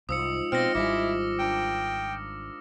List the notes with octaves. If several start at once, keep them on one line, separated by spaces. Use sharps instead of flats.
C2 G#2 F3 D#6 E6 C#7
B2 C4 F4 D5 D#5 F6 A#6
G#1 F3 G3 G#3 E4 D6
D4 A#4 G5